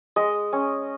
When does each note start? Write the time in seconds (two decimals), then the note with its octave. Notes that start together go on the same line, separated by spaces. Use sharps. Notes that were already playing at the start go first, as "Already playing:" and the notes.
0.16 G#3 D#5
0.53 C#4